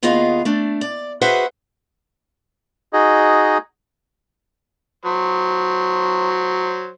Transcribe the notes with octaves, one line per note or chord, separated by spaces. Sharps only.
D#2 B3 F4 G#4 D#5 F5
A3 D4
D5
F#4 G#4 B4 C5 E5 F#5
D#4 F#4 G#4 D#5
F#3 C5